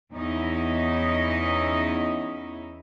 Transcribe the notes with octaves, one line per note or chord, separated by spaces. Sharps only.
E2 C#4 D#4 E4 D#5